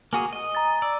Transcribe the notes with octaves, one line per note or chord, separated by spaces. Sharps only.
A#3 F#4 G#4 G#5
D#5
A#5 A6
D5 E6